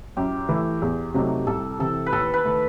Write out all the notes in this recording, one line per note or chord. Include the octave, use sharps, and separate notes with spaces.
F#2 G4
E3 A3 E4
E2
C3 F#3 A3 D#4
C2 A4
C3 E3 A4
B4
D#2 A4
B4
D#3 A3